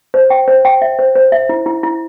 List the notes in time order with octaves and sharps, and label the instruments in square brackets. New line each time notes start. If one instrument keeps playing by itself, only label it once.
[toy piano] C5
G5
C5
G5
E5
C5
C5
E5
E4
E4
E4